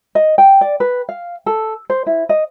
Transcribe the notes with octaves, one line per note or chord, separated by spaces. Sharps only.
D#5
G5
D5
B4
F5
A4
C5
E4
D#5